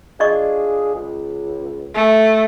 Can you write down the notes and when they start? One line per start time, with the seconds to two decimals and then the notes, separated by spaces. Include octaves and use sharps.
0.20 D4 F4 G#4 D5 D#5 C#6
0.94 C#2
1.95 A3